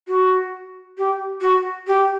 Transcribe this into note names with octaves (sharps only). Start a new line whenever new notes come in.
F#4
G4
F#4
G4